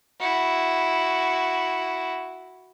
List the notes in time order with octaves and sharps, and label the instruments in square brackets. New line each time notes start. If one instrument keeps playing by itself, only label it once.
[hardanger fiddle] E4 F#4